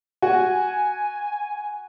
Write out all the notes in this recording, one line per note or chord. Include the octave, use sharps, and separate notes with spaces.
F#4 G#5